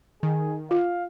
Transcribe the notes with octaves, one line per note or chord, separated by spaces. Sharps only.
D#3 G#4
F4 F5